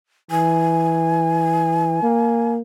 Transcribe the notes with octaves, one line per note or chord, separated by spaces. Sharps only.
E3 G#5
A#3